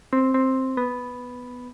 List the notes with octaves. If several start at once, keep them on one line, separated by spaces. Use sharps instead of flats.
C4
C4
B3